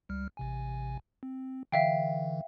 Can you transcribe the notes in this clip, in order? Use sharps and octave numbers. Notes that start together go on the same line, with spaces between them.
C#2 G3 F6
A1 C3 G#5
C4
D3 E3 E5 F5 G5